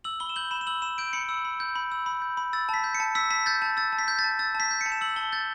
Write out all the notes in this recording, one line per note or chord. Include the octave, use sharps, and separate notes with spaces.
E6 F#7
B5 G7
E7
G6 F#7
B5 E7
E7
E6 F#7
B5 E7
G6 D7
B5 C#7
E6
B5
G6
B5
E6
B5
G6
B5
E6 A6
A5 B6
G6
C#7
A5
E6 B6
A5 B6
G6 A6
A5 A6
E6 A6
A5
B6
G6
A6
A5
E6 A6
A5
B6
G6
C#7
A5
E7
E6 F#7
A5 G7
G6 A6